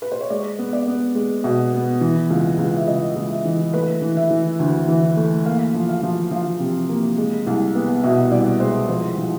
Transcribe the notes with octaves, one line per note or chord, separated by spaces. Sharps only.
B4
C5
C#5
G#3 D5
B3
D5
B3
G#3
B2
B3
E3
C#2
C#2
E5
C#2 D#5
C#2
E5
E3
A3 B4
E3
E5
E3
D2
E3
A3
A#3 F5
F3
F5
F3
F3 F5
C3
A#3
G#3
C2
B3
B2 E5
C2 D5
G#3 C5
F3 C5
F3